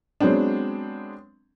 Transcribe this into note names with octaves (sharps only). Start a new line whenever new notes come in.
F#3 G#3 B3 C4 D4